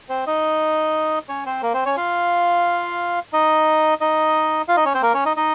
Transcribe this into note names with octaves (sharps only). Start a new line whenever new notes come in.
C4 C5
D#4 D#5
C#4 C#5
C4 C5
A#3 A#4
C4 C5
C#4 C#5
F4 F5
D#4 D#5
D#4 D#5
F4 F5
D#4 D#5
C#4 C#5
C4 C5
A#3 A#4
C#4 C#5
D#4 D#5
D#4 D#5